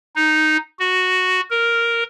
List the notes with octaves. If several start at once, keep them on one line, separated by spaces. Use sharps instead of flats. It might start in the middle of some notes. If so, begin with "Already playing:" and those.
D#4
F#4
A#4